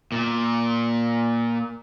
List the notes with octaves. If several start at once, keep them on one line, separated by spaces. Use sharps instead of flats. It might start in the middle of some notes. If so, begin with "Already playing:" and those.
A#2